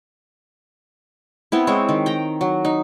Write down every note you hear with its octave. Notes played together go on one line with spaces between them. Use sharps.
B3 C4 E4
G#3 C4 C#5
D#3
G5 A#5
F#3
D#4